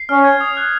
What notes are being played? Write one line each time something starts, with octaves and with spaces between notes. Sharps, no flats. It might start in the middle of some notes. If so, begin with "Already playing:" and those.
Already playing: C7
C#4 F6
G#6
D#6
F#6